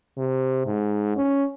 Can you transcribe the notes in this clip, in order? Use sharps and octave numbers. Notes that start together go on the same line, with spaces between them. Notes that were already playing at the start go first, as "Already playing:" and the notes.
C3
G#2
C#4